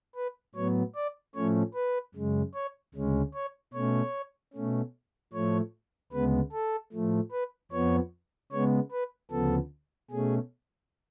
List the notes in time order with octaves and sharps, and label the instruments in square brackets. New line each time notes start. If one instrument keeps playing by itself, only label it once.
[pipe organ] B4
A2 F#3 B3 C#5
D5
A2 F3 A3 C#4 C#5
B4
F#2 C#3 G#3
C#5
D2 C#3 G#3 C#4
C#5
B2 A3 C#4 C#5
B2 A3 C#4
A2 F3 A3 C#5
D2 C#3 G#3 B3 B4
A4
A2 F3 A3
B4
F2 F3 B3 C#5
C#3 G#3 B3 C#5
B4
D2 C#3 F3 B3 A4
B2 A3 C#4 G#4